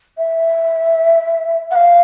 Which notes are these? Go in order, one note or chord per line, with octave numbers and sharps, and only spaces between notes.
E5
F#5
F5